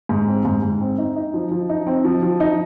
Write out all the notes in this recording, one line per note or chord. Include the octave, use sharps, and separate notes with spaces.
G#2
C4
G#2
G#2
C4
D#4
D#4
F3
F3
D#4
C4
F3
F3
D#4